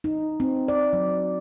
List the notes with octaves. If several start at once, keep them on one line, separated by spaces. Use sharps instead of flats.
D#4
C4
D5
F#3